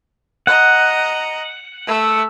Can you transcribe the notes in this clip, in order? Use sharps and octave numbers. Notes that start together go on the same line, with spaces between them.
D#5 F#5 A#5
A3 E5